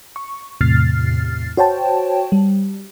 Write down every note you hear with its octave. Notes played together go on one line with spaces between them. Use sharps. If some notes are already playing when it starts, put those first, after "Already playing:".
C#6
E2 A2 C3 F6 A6 C7
F#4 C5 C#5 G5 A5
G3